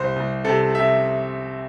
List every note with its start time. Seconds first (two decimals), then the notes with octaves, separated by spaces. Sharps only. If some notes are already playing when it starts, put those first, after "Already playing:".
Already playing: C2 C5
0.16 C2
0.45 C3 A4
0.75 C3 E5